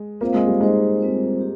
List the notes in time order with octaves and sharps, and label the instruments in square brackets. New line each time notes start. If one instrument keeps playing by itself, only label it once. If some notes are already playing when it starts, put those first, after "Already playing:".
Already playing: [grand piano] G#3
[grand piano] A#3 [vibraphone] C4 F4 C5 F5
[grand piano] G#3
G3
[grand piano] G#3 [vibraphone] D#4 G#4 C5
[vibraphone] G3 C4 F4 C5
G4